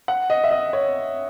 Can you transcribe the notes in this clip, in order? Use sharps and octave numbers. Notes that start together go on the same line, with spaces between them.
F#5
D#5
E5
D#5
C#5